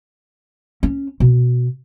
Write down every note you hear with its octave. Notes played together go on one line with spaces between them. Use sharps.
C#4
B2